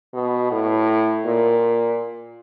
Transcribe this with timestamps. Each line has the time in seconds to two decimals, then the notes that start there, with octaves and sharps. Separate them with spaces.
0.14 B2
0.52 A2
1.25 A#2